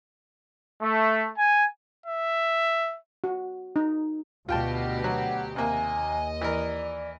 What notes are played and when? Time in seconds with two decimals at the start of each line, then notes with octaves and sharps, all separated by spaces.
0.81 A3
1.37 G#5
2.06 E5
3.24 F#4
3.76 D#4
4.49 D2 B2 F4 G4 G5 A5
5.04 F#3 F#5
5.56 D#2 C3 A#3 D#5 G#5
6.41 E3 A#4 D5